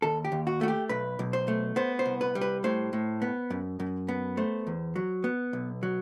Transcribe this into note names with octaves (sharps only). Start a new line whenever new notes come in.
D#2 A4
G4
D#2
F#4
A3 F#4
G4
B1 B4
B1
C5
A3
B3 C5
C5
C2
B4
G3
B4
A2 C5
A2
B3
F#2
F#2
B3
A3 C5
E2
F#3
B3
B1
F#3